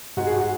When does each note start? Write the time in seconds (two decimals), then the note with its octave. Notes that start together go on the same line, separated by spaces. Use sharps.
0.17 G#2 F#4
0.26 G#4
0.36 F#4